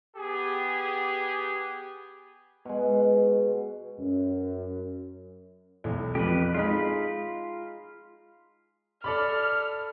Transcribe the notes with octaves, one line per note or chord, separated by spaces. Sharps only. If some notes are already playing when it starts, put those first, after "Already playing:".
B3 G4 G#4
B2 G#3
F#2
B1 E2
F2 G4 B4
G#3 D#4 F4 G#4 B5
A4 D5 B5 F6